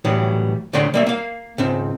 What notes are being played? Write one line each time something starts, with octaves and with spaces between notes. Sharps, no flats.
A2 E3 F#3 G3
D2 A2 D3 D4 G5 C6
G3 A#3 E5
A#3 F5
C#2 G#2 C4